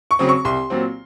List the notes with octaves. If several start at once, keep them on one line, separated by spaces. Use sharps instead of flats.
C#6
C#3 F#3 C4
C#6
C2 C6
A#2 F#3 C4